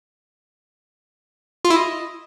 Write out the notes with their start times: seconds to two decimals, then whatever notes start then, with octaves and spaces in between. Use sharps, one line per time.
1.65 F4
1.70 E4
1.76 D#5